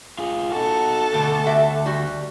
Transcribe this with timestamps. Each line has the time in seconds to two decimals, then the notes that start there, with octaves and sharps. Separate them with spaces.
0.19 F4 G#4
0.52 D#4 F#4 A4
1.14 D2 B2
1.46 F#4 G4 E5
1.86 G3 F#4